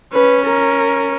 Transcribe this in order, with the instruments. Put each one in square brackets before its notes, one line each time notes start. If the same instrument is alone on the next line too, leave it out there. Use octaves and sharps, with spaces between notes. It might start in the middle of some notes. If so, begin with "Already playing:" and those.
[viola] C#4 [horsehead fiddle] B4
[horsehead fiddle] A#4